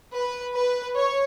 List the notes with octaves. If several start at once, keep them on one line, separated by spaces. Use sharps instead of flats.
B4
B4
C#5